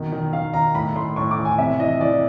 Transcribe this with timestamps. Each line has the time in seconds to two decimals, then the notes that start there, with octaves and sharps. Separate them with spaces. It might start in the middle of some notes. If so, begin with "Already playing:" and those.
Already playing: B2 D#3
0.12 D#3
0.33 D#3 F5
0.54 D#3 A#5
0.75 A2 B5
0.95 A2 C6
1.16 A2 C#6
1.31 D6
1.38 E3
1.45 G#5
1.58 C3 E5
1.79 E3 D#5
2.00 E3 D5